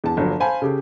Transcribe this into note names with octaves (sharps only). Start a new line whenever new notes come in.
E2 A5
G1 F3 F#3
C5 F5 G#5 A5 B5
C#3 G4 A4